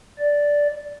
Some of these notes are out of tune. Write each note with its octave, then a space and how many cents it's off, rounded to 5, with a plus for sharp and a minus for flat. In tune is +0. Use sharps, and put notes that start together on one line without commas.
D5 -5